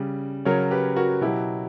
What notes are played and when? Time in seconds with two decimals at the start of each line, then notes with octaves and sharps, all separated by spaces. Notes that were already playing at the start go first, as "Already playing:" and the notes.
Already playing: C#3 G3
0.45 C#3 F#3 A#4 C#5
0.71 G4 B4
0.96 F#4 A#4
1.21 B2 F#3 E4 G4